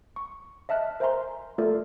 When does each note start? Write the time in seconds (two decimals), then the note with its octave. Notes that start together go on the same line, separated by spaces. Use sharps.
0.16 C#6
0.69 D#5 E5 A5 F6 F#6
1.00 A#4 C5 E5 G#5 A#5 C6
1.58 A3 F4 A4 A#4 D5